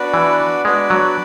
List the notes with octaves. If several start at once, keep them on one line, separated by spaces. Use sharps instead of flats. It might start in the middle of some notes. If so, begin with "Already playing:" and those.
Already playing: B3 D4 F#4 B4 D5
E3
G#3 B3 D4 F#4 B4 D5
F#3